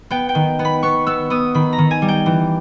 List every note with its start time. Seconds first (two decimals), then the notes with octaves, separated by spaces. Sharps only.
0.11 B3 G5
0.29 G5
0.35 D#3
0.59 B3
0.65 B5
0.83 B3 C#6
1.07 B3 E6
1.30 B3 D#6
1.54 D#3 B5
1.73 A#5
1.78 D#3
1.91 G#5
2.02 G3
2.08 G5
2.26 E3